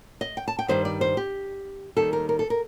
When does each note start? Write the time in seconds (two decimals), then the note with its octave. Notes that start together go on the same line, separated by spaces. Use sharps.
0.21 D#5
0.37 G5
0.48 A5
0.59 G5
0.68 G2 D#3 G3 C5
0.85 D5
1.01 C5
1.17 G4
1.97 D#2 D#3 G3 A4
2.13 A#4
2.29 A#4
2.39 A4
2.50 A#4